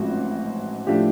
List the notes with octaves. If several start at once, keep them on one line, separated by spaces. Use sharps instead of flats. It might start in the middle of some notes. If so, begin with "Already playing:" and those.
Already playing: A1 G#2 F3 A3 C4 F#4
A2 F3 A3 D4 G4